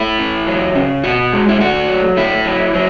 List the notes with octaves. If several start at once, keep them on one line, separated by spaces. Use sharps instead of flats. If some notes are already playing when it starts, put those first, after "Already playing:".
Already playing: A3 E4
E3
F#3
C#3
B2 F#4
G#3
E4
A3 F#4
F#3
A3 E4
F#3
F#3